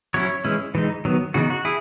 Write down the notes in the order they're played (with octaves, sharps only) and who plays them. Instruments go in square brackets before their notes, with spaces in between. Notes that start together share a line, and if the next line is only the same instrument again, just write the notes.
[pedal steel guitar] F#3 C#4 E4 C#5
E3 G#3 C#4 E4
E3 G#3 D#4
D#3 F#3 B3
C#3 E3 B3 D#4 F#4
F#4
E4 G#4